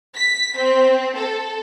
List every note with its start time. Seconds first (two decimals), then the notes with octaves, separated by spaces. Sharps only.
0.16 B6
0.57 C4
1.16 A4